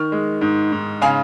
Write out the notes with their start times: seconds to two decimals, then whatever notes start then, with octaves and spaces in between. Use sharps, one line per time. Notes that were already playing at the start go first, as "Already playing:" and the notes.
Already playing: D#3 C#6 F6
0.12 G#3
0.41 G#2
0.72 G#2
1.02 C#3 F5 G#5